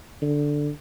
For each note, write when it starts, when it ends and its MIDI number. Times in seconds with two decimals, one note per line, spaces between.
0.22 0.70 50